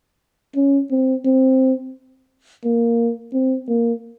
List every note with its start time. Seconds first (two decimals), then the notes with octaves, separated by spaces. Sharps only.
0.56 C#4
0.91 C4
1.25 C4
2.64 A#3
3.33 C4
3.69 A#3